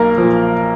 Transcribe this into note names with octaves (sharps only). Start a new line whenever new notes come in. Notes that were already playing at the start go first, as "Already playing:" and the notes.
Already playing: B1 A#3 A#4
A#2 F3